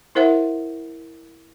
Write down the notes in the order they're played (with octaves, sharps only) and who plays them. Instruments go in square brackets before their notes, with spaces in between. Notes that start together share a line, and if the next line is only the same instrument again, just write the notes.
[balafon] E4 A#4 C5 E5 F#5